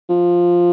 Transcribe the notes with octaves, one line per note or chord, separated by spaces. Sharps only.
F3